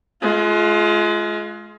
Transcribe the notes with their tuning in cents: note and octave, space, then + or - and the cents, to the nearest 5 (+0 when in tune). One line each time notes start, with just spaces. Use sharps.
G#3 +35 F4 -10